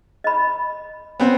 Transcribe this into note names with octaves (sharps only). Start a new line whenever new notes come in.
D#5 B5
B3 C4